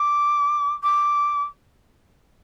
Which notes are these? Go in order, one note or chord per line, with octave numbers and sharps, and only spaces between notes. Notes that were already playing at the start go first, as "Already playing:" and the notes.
Already playing: D6
D6